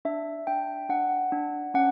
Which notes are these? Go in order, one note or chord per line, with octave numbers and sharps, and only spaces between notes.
D4 E5
D4 G5
D4 F#5
D4
C#4 F#5